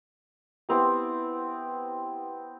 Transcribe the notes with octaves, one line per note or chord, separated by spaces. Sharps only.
B3 C4 E4 G4